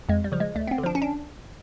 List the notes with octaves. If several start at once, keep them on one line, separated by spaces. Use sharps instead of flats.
F2 G#3
G3
C#3 F3
G#3
D2 A3
B3
C4
D3
F3 D4
C#4
D4